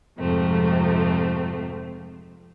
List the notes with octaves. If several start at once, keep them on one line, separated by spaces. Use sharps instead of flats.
F2 G#2 C3 F3 A3 C4